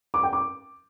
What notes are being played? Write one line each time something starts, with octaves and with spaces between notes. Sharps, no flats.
D6
G5
D6